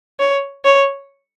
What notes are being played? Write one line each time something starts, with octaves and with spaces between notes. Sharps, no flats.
C#5
C#5